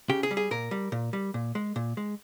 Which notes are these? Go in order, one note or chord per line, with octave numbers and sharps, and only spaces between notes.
C#3 G4
G#4
G3
G#4
A#2 A#4
G3
A#2
G3
A#2
G#3
A#2
G#3